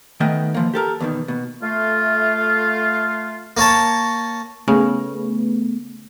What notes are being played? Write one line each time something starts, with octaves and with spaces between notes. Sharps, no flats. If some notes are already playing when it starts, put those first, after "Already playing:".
D#3 A3 B3 D#5 G5
E3 F3 A#3
G4 A4 A#4
E2 B2 D#3
B2
A3 F4
A#3 C#5 A5
C#3 A3 B3